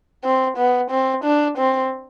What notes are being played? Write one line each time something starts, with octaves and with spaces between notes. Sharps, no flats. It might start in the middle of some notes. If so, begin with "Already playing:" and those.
C4
B3
C4
D4
C4